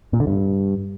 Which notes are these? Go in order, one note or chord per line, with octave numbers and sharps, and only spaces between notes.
A#2
D3
G2